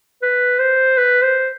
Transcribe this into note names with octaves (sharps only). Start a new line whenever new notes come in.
B4
C5
B4
C5